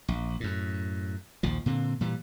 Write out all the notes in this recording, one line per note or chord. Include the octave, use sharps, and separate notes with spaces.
A#1
F#2 A2
A#1 D#2 F3
A#2 D3 C4
A#2 E3 G3